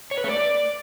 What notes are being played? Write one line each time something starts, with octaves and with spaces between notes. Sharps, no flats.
C#5
B4
A3
D5